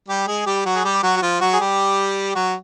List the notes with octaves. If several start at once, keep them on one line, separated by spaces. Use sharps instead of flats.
G3 G4
G#3 G#4
G3 G4
F#3 F#4
G#4
G3 G4
F#3 F#4
F#4
F3 F4
F#3 F#4
G#4
G3 G4
F#3 F#4